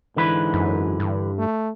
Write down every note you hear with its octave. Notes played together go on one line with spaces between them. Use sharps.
G#2 D3 E3 B4
F#2
G2
A3